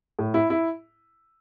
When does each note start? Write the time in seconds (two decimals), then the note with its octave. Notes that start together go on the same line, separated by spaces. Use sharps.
0.19 A2
0.34 E4
0.50 E4